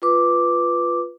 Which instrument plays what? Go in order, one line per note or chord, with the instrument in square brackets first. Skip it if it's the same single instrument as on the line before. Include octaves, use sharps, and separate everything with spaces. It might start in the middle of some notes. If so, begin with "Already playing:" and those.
[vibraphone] F4 B4 D6